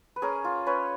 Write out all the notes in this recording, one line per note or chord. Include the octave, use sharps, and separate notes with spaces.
B4
C#4 G#4 A#4
F4
C#4 B4 C#5